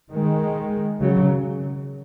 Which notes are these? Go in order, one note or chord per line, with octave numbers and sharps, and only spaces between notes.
D#3 G#3
C#3 F#3